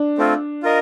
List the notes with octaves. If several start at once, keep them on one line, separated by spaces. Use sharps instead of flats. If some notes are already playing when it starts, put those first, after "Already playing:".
Already playing: D4
A3 C4 F4
F4 A#4 D#5